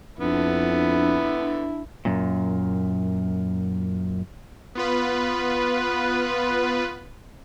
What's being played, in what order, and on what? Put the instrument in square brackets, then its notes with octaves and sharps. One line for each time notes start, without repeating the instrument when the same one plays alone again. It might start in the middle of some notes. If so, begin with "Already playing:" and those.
[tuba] F2 [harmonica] D3 B3 [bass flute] D4 [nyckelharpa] E4
[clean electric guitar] F#2 A#2
[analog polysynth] B3 F4 B4